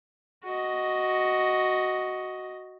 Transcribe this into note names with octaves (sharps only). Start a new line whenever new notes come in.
F#4 D#5